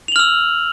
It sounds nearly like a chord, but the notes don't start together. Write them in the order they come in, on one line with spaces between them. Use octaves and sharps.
F7 F#7 F6 E6